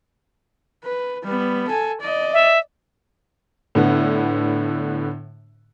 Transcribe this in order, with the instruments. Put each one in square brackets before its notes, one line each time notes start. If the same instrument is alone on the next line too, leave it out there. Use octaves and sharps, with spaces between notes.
[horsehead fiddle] B4
G3 B3
A4 G#5
D5 D#5
[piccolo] E5
[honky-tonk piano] A2 D3 B3